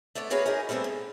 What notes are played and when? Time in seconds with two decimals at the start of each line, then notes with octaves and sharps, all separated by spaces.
0.15 A3 B3 C#5 D5
0.30 A#3 F#4 G#4 B4 C#5 F5
0.45 C#4 D#4 G#4 A#4 G#5
0.69 G3 A3 B3 C4 D4
0.84 G#2